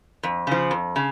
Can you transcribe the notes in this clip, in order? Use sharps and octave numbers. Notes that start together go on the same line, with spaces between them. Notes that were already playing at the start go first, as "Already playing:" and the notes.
F2
C#3 F3
F2
C#3